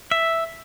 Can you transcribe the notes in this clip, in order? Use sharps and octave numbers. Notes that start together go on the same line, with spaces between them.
E5